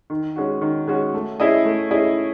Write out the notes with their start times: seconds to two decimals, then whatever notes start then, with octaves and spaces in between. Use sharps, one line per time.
0.10 D#3
0.36 G#3 C#4 F#4
0.61 D#3
0.88 G#3 C#4 F#4
1.14 A3
1.40 C#4 E4 G#4 D#5
1.65 A3
1.91 C#4 E4 G#4 D#5